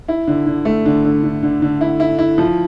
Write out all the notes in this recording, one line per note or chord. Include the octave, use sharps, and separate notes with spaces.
E4
D3
D3
A3
D3
D3
D3
D3
D3
E4
E4
E4
F3